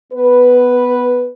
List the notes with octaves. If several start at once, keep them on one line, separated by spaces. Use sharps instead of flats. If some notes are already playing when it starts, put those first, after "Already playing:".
B3 B4